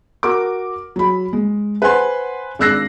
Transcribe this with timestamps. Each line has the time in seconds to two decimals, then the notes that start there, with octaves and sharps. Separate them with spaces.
0.23 F#4 A#4 D6
0.96 F#3 B5
1.33 G#3
1.82 B4 C5 F#5 G#5 C6
2.59 G#1 D4 E6 F#6 A#6 C7